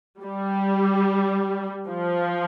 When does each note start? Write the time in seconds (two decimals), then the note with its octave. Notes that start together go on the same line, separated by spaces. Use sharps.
0.21 G3
1.88 F3